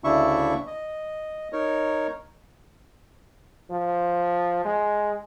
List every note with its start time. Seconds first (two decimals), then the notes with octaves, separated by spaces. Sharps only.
0.04 D2 C#3 D4 E4 E5 C#6
0.67 D#5
1.53 D#4 A#4 C#5
3.71 F3
4.65 G#3